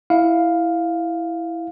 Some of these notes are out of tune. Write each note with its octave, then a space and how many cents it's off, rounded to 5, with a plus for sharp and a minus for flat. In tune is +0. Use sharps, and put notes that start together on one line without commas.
E4 +0 F5 +5